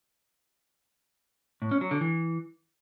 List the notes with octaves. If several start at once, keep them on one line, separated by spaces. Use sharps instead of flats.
A2
C#4
F#3
D3
E3